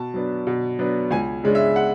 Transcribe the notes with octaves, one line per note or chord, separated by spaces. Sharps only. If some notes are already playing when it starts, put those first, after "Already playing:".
Already playing: B2 A5
F#3 B3 D4
B2
F#3 B3 D4
C#2 G#5
C#3 G#3 D4
E5
F#5